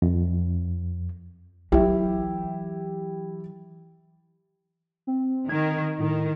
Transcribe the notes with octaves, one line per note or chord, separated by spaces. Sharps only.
F2
E3 F#3 E4 G4
C4
D#3 G#6
A2 D#3